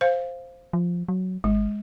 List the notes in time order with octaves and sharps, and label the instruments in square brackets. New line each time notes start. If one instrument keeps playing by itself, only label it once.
[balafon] C5 F5
[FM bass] F3
F#3
[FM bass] G#1 [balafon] G#3